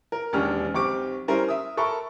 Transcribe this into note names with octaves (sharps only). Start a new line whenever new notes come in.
A#4
E1 D#2 C#4 D4 G4 F6
B1 C4 G4 C#6 D6 D7
G3 C#4 E4 A#4 C5
E5 D#6
A4 A#4 E5 B5 C#6